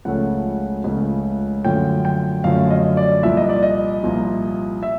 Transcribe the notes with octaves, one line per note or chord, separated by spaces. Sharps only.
C#2 C#3 F3 A3 C#4 F#5
C#2 C#3 F3 A3 C#4
F#2 D3 F3 A3 C#4 G5
G5
F#2 D3 F3 A3 C#4 F5
D#5
D5
C2 A#2 F3 A#3 E5
D#5
D5
D#5
C2 A#2 F3 A#3
E5